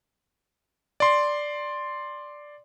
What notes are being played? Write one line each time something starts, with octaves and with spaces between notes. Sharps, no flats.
D5 C6